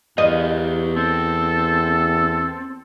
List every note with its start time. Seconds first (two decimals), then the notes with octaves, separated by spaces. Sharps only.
0.18 E2 G4 A#4 D#5 F5
0.96 C4 A4